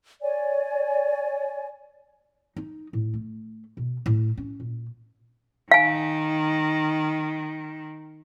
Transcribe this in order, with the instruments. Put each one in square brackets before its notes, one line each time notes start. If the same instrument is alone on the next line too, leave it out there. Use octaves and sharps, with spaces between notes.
[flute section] C#5 D5 G#5
[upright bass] D#4
A2
A3
B2
A2
C#4
A#2
[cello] D#3 [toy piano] F5 G#5